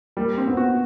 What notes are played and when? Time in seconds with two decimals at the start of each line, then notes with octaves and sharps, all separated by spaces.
0.17 G3 A#3
0.38 C4
0.48 B3
0.57 F#4